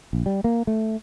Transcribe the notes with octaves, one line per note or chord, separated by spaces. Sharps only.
A#1
G3
A#3
A3